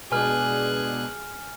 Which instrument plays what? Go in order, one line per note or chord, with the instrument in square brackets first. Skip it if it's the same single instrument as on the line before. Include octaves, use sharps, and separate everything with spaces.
[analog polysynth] B2 G#3 D4 [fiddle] G#4 F#6 [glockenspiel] G#5 F6